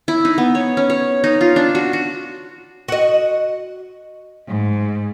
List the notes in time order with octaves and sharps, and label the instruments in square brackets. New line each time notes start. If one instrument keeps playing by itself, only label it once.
[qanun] E4
D#4
B3
C#5
C#4
C#5
D#4
F4
D4
F#4
F#4
[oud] F#4 D#5
[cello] G#2